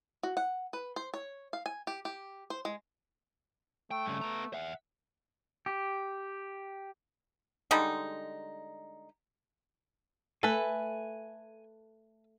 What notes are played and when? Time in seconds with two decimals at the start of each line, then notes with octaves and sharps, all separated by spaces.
0.23 F#4
0.37 F#5
0.73 B4
0.96 C5
1.14 C#5
1.53 F5
1.66 G#5
1.87 G4
2.05 G4
2.50 C5
2.65 G#3
3.91 A3 G5
4.05 G2 C#3
4.21 B3 A#5
4.54 E5 F#5
5.66 G4
7.71 D3 G3 G#3 D#4
10.43 A3 A4 B4 G#5